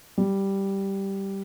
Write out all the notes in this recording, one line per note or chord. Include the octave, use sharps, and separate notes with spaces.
G3